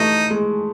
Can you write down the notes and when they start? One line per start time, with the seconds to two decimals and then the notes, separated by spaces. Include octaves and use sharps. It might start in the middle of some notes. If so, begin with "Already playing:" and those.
Already playing: E3 A3 D#4
0.30 G#3